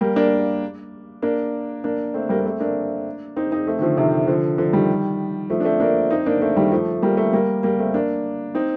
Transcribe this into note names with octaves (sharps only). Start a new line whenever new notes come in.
G3 A#3
A#3 D4
A#3 D4
A#3 D4
A3 C4
G3 A#3
A#3
A3 C4
A#3 D4
C4 D#4
C4 D#4
A3 C4
D#3
D3 F3
C3 D#3
D3 F3
D3 F3
D#3 G3
F3 A3
D4
A3 C4
A#3 D4
C4 D#4
A#3 D4
A3 C4
D#3 G3
F3 A3
G3 A#3
A3 C4
G3 A#3
G3 A#3
A3 C4
A#3 D4
C4 D#4